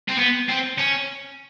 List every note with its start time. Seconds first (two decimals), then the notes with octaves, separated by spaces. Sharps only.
0.08 C4
0.18 B3
0.49 C4
0.78 C#4